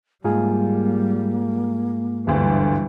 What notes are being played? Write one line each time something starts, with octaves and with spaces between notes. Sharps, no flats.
G#2 G3 A#3 F4 G#4
G1 D2 E3 G3